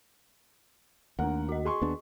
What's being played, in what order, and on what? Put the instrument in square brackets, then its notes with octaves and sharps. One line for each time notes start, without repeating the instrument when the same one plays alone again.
[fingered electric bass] D#2 [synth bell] A3 D4 [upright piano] A#4 F#5
[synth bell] F#4 D#5
[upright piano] G#4 C6 C#6
[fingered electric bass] D#2 B3 D4